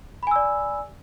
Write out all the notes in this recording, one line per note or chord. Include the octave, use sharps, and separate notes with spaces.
D5 G#5 B5 E6